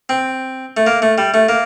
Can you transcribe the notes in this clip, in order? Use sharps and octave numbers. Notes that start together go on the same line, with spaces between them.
C4
A3
A#3
A3
G3
A3
A#3